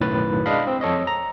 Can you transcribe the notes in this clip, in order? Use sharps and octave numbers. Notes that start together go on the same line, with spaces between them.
B1 F#2 A2 D#3 B4 A6
G#3 D4 D#5 F5 B5
C4
F2 A4 C#5 D#5
A#5